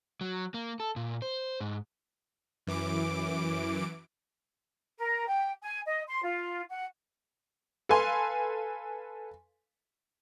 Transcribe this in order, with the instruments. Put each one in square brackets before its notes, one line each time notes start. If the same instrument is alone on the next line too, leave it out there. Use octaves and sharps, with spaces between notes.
[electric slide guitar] F#3
A#3
A4
A#2
C5
G#2
[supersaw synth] F#2 E3 D6 D7
[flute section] A#4
G5
G#5
D#5
C6
F4
F#5
[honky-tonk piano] A4 B4 F5 G#5 C6